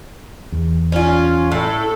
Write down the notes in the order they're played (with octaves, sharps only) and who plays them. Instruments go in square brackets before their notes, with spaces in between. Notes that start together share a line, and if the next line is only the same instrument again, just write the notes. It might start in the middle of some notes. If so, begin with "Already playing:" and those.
[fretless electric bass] E2
[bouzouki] C#4 F4
[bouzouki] A2 [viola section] A4